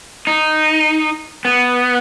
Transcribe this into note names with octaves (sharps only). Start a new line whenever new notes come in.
D#4
B3